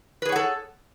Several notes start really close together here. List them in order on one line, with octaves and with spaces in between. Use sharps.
B4 G#4 C#5 F#5 A4